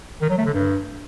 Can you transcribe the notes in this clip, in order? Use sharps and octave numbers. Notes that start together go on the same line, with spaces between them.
D#3
F#3
A3
D3
G2